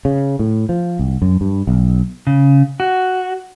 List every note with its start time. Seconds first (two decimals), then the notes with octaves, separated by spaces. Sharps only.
0.05 C#3
0.39 A2
0.69 F3
0.99 C2
1.22 F#2
1.41 G2
1.67 B1
2.27 C#3
2.80 F#4